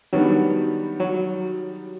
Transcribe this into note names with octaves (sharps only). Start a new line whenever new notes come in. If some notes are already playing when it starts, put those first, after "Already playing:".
D#3 F#3 G3 B3 D4
F#3